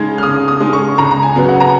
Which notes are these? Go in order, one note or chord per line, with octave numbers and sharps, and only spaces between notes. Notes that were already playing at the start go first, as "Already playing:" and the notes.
Already playing: C#3 G#3 D#4 G#6
F6
C#3 D#6
D#6
G#3 D#4
C#6
C#2 A#5
A#5
G#5
C#3 F#3 B3
F#5
A#5